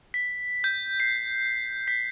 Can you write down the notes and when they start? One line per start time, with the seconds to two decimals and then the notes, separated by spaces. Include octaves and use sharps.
0.14 B6
0.64 G6
1.00 C7
1.88 B6